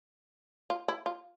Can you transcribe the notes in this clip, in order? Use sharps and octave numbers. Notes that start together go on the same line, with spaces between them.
F4
E4
F4